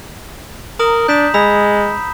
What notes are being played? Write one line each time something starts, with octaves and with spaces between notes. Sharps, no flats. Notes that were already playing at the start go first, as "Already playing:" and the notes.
A#4 A#5 D#6 F#7
D4 G6 B6 E7
G#3 B5 E6 B6